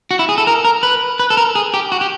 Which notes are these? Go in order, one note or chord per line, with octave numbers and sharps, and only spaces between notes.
F#4
E4
G#4
A4
A#4
A#4
B4
B4
A4
A#4
G#4
G4
F#4
G4